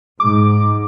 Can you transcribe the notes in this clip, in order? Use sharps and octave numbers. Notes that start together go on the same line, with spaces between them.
G#2 D6